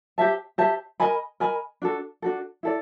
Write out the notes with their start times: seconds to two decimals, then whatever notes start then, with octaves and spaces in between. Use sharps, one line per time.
0.18 G4 C5 E5 A5
0.58 G4 C5 E5 A5
1.00 A#4 D#5 G#5 B5
1.40 A#4 D#5 G#5 B5
1.82 D4 F#4 A4
2.22 D4 F#4 A4
2.63 E4 A4 D5